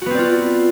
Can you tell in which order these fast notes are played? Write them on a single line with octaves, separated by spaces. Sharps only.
F#4 B3 C4 D5 F4